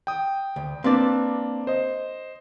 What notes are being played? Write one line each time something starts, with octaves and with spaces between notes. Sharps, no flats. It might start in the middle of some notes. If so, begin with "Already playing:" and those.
G5 D#6
D2
A#3 C4 D4 B4 D5
C5 D#5